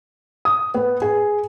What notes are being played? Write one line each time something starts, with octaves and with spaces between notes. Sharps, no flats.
D#6
B3
G#4